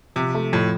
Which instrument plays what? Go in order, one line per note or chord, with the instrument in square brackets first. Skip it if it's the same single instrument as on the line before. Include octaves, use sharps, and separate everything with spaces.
[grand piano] C3 [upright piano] F3
[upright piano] A3
[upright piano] F2 [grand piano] A2